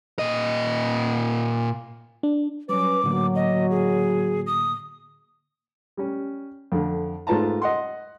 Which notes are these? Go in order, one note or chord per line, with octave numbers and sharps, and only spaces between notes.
A#2 D#5
D4
F#3 G3 C#4 B4 D6
A2 D3 F#3 A#3
D#5
G#4
D#6
G3 C#4
F2 D3
G#2 A3 F4 B4 A5 A#5
D#5 F#5 C6